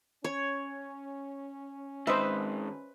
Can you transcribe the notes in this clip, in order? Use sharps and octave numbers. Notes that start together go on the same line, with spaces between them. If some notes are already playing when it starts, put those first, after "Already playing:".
C#4 C#5
G#2 D#3 B4 C5 D#5 E5